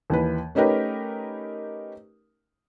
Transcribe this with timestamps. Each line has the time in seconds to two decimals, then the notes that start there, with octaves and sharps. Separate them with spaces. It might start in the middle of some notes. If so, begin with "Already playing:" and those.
0.10 D#2 E3 B4
0.55 A3 C#4 D#4 G4 A#4 B4